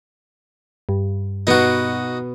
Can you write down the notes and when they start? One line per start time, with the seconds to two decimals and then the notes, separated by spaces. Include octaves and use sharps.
0.89 G2
1.47 B2 B3 D#4 F#4